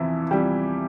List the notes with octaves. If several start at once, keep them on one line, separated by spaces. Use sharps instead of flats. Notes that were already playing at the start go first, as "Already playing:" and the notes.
Already playing: E2 C3 E3 F3 E4
E2 C3 F3 G3 G4